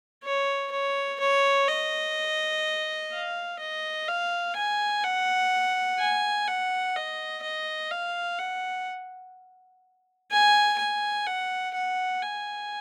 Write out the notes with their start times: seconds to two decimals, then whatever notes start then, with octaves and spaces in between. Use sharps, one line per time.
0.24 C#5
0.72 C#5
1.20 C#5
1.68 D#5
3.12 F5
3.60 D#5
4.08 F5
4.56 G#5
5.04 F#5
5.99 G#5
6.48 F#5
6.96 D#5
7.43 D#5
7.91 F5
8.39 F#5
10.32 G#5
10.79 G#5
11.27 F#5
11.75 F#5
12.22 G#5